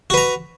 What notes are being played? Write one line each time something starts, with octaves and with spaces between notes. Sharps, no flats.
F#4 B4 A#5